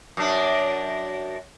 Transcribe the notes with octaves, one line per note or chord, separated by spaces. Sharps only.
F#2 D4